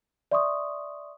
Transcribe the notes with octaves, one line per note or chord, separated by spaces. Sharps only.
D5 E5 C6 C#6 D#6